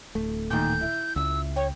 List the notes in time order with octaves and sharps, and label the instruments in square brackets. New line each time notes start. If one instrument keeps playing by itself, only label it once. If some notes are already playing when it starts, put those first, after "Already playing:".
[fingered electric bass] D1 A3
[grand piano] A#2 D#3 [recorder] G6
[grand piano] E4
[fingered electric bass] C#2 [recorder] E6
[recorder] C#5 [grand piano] G5